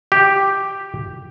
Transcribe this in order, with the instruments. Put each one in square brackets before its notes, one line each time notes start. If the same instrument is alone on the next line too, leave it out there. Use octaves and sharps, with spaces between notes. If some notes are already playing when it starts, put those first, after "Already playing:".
[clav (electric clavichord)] G4